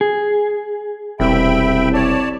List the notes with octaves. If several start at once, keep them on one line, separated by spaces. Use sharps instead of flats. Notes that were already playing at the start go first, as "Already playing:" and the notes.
G#4
E1 C2 E5 G5 B5
C#5 D5 A5